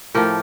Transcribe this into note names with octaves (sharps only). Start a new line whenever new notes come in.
A2 F3 A3 G4 A#4